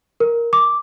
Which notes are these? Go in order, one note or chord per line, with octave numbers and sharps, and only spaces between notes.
A#4
D6